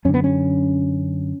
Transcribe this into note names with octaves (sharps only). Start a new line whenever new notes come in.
F#2 D3 C#4
B3
C#4